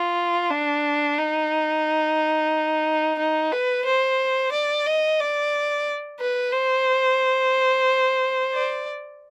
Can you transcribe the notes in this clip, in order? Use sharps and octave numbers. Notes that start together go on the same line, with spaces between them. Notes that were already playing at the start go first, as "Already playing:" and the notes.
Already playing: F4
D4
D#4
D#4
B4
C5
D5
D#5
D5
B4
C5
D5